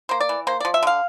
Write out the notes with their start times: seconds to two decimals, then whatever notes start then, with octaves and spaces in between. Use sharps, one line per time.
0.09 A#3 C5
0.20 D5
0.29 E3
0.47 A#3 C5
0.60 F3 D5
0.74 E5
0.83 D3 F5